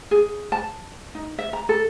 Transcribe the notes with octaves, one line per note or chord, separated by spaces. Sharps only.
G#4
A5
D#4
E5
A#5
A4